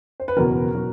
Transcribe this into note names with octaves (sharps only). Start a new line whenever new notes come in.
C5
B4
F#1 E2 B2 F#3 A#4
B2 F#3